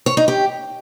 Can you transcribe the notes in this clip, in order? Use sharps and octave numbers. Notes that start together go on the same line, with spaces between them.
C#5
D#4
G4